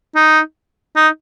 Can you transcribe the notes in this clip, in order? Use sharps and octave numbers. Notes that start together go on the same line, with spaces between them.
D#4
D#4